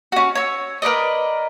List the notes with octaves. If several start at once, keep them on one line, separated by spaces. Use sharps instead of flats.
C#4 F#4
C#5 E6
A#4 B4 D5 D#5